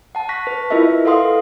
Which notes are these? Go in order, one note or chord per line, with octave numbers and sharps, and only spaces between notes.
F#5 A5
C#6 F#6 A#6 B6
B4
E4 F4 A#4 B4 D#5 E5
A4 B4 F5 F#5 C6 D#6